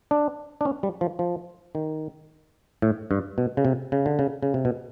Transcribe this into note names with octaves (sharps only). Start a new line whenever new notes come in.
D4
D4
C#4
G3
F3
F3
D#3
A2
G2
B2
C#3
C3
C#3
D3
C#3
C#3
C3
B2